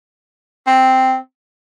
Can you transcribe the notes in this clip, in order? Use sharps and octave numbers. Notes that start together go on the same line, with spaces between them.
C4